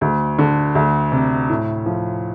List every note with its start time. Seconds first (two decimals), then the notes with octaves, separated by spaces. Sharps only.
0.01 D2
0.38 D3
0.75 D2
1.12 C3
1.49 A2
1.86 F3